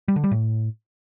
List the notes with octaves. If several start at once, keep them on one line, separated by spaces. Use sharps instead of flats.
G3
D3
G3
A2